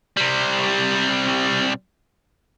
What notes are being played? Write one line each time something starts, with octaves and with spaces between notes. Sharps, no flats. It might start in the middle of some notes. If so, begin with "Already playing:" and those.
C3 G3